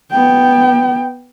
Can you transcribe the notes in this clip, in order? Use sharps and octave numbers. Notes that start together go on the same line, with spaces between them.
B3 G5